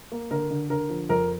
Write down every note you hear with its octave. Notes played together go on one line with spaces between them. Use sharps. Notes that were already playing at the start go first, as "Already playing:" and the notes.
A#3
D3 A#4
D3
D3 A#4
F3
F2 A#4